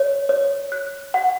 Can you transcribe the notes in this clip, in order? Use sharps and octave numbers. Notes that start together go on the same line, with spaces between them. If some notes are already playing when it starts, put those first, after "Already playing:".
Already playing: C#5
C#5
F#6
F#5